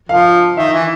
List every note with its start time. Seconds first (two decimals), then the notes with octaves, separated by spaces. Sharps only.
0.09 F3 F5
0.57 D#3 E5
0.73 E3